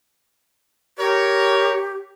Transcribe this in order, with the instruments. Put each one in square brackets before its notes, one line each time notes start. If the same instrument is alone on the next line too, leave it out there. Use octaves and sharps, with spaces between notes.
[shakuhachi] G4 [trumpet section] A#4 C#5